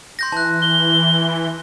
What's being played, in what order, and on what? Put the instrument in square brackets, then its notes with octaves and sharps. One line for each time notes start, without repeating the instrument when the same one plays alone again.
[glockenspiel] C6 G6 A#6
[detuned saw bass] E3 [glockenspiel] A5 F#6
[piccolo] G7